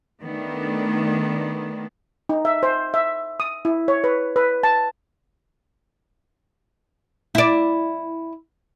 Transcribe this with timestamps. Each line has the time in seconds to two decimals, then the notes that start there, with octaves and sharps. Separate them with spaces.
0.21 D#3 A3 B3 D4
2.29 D#4
2.45 E5
2.63 C5
2.94 E5
3.40 D#6
3.65 E4
3.88 C#5
4.04 B4
4.36 B4
4.63 A5
7.35 E4 D5